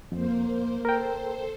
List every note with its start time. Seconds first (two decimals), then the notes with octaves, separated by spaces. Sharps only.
0.12 F2 A#3 C5
0.85 A4 A#4 C5 G5